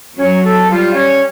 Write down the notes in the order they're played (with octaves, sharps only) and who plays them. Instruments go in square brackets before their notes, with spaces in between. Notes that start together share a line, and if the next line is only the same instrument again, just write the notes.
[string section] F#3 [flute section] C#4
[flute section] A4
[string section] G3 [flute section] F4
[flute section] C#4